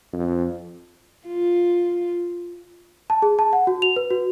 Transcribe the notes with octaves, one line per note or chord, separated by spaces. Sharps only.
F2
F4
A5
G#4
A5
F#5
F#4
F7
B4
F#4